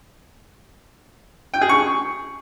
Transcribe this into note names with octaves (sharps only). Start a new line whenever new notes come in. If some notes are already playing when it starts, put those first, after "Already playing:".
G5
G#4
C#6